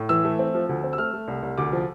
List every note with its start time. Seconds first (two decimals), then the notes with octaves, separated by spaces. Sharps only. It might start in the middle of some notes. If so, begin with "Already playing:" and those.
Already playing: A2
0.09 E3 E6
0.24 A3
0.39 C4
0.54 F3
0.69 D2
0.84 C4
0.93 E6
0.98 A3 F6
1.13 A3
1.28 C2
1.43 C2
1.58 D2 D6
1.72 F3